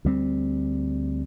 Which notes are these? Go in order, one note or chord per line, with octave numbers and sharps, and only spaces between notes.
D2 G3 C4